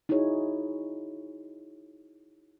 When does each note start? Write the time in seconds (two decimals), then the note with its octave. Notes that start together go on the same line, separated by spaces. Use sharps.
0.09 D#4 E4 F#4 G#4 C#5